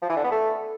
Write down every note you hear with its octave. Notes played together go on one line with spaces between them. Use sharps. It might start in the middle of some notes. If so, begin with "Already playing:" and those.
F3
E3
D3
B3
A3